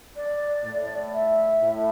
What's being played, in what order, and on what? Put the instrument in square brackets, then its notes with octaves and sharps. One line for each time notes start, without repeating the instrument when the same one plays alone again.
[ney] D5
[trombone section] A2
[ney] E5
[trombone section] A2